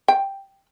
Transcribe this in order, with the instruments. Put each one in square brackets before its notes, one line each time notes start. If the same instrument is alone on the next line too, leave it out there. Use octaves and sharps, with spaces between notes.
[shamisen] G5